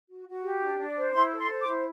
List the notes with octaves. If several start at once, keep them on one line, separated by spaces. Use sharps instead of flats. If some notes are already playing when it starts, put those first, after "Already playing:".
F#4
F#4
G4
D4
D4
C5
E4 C6
A4
C6
C5
D6
E4